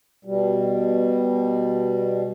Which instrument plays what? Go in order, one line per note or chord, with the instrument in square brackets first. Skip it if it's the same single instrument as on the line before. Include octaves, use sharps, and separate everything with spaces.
[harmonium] B2 G3